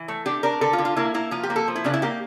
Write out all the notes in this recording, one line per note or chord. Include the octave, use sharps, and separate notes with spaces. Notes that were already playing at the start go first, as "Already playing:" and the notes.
Already playing: E3
A3
D4 G4
D4 A#4
D3 A4
F4
D3
F4
A#3 E4
A#3 E4
F3 F4
G4
A#3
A4
F3
E4
C#3 D4
E4
A#3 G4